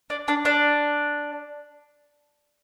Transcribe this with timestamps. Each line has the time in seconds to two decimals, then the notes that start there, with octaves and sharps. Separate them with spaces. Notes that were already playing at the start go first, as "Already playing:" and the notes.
0.10 D4
0.28 D4
0.45 D4